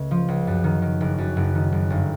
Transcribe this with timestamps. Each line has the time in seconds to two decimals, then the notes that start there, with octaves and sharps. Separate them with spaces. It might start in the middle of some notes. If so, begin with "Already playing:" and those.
Already playing: C#2 A3
0.11 F3
0.28 C#2
0.47 F#2
0.64 D#3
0.82 D#3
1.01 F#1
1.18 F#2
1.37 F#1
1.55 D#3
1.72 F#1
1.90 G1